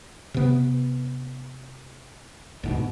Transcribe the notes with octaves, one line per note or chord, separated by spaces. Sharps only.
C3 B3
D2 G#2 B2